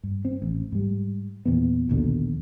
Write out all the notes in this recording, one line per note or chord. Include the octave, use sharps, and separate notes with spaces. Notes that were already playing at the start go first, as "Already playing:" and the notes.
G2
C4
A1
G#2 G3
E2 A#2 E3 B3
A#1 D#2 B2 D3